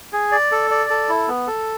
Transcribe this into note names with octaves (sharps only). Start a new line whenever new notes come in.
G#4
D5
A4
D5
A4
E4
B3
A4